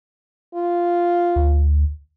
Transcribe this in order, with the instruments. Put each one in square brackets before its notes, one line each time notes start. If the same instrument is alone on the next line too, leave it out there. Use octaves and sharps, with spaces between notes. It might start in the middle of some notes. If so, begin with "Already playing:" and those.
[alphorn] F4
[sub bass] D2